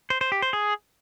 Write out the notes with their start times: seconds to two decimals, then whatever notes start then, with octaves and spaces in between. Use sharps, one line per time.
0.10 C5
0.21 C5
0.32 G4
0.42 C5
0.53 G#4